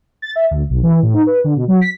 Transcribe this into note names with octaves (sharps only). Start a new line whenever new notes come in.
A6
E5
D2
B1
E3
A2
D#4
B4
D3
B2
F#3
B6